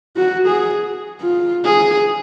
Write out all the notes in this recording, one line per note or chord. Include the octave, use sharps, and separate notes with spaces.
F#4
G#4
F4
G#4